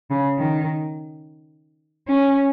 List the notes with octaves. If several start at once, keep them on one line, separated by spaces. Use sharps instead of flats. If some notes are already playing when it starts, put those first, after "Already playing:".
C#3
D#3
C#4